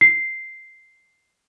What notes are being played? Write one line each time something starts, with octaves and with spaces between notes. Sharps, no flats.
C7